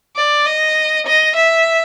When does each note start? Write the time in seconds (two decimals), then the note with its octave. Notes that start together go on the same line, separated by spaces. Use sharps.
0.16 D5
0.46 D#5
1.06 D#5
1.35 E5